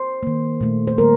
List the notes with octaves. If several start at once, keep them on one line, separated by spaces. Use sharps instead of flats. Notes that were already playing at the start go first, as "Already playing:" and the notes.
Already playing: C5
D#3 A#3
A#2 A3
C5
D#3 G3 A#3 A#4